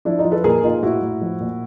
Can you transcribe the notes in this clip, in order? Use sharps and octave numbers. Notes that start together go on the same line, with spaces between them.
F3 D4 E4
D#4 F4
F3
A4 B4
A#2 G#4 A#4
A#2 D#4 F4
A2 E4 F#4
A2
F3
A#2